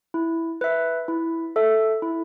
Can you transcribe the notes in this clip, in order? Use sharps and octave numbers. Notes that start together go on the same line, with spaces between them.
E4
B4 E5
E4
A4 E5
E4